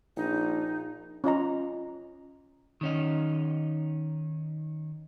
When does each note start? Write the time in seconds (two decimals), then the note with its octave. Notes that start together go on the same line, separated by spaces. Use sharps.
0.17 A#1 D#4
1.24 C#4 F4 D#5 A#5
2.81 D#3 C#4 D#4